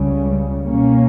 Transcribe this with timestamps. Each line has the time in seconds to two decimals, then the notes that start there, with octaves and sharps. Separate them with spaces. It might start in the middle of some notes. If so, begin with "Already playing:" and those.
Already playing: C#2 C#3 G3
0.65 B2 A#3 C#4